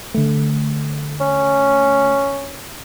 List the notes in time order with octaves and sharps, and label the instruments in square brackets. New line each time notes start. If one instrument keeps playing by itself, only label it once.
[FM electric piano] D3 A3
[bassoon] C#4